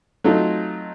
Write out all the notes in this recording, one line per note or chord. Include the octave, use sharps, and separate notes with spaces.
F#3 A3 C4 D#4 F4